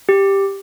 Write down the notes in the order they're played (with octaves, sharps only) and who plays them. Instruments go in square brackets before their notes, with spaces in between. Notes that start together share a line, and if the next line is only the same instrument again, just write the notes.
[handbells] G4